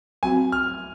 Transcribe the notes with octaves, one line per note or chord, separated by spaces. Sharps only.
F#3 C4 F#4 G#5
F6